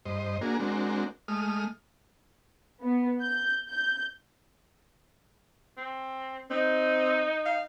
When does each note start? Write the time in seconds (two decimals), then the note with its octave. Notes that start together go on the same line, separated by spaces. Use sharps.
0.06 G2 C5 D#5
0.41 A#3 D4 F#4 G#4 A#4
0.60 G#3 C4 D4 F#4 A#4
1.28 G#3 A3 D#6 F6
2.83 B3
3.21 G6
3.69 G6
5.77 C4
6.50 C4 D#4
7.46 F5